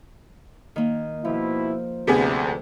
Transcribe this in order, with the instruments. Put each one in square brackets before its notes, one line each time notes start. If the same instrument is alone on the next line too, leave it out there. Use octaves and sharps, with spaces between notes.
[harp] D#3 A#3
[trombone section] B2 E4 [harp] F3
[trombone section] D2 [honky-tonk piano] C3 B3 G#4